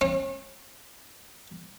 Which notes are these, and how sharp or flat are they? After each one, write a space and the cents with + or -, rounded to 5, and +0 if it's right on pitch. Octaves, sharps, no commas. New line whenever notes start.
C#4 -40